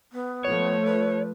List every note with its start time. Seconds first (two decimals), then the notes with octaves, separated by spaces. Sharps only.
0.12 B3
0.45 F3 A3 C#5
0.85 B4